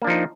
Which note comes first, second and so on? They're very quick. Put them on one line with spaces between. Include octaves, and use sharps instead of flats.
A#3 D4 F3 D#4